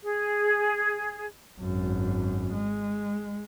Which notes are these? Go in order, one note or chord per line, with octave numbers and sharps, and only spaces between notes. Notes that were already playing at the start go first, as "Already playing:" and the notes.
G#4
G#1 F#2
G#3